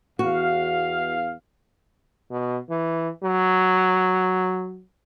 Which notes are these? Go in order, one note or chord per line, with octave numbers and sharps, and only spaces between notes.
E2 F#4 F5
B2
E3
F#3